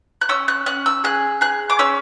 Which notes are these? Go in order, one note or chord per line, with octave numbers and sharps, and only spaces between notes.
F#6
C#4 E6
F#6
C#4 F#6
E6
G#4 F#6
G#4 F#6
D6
C#4 E6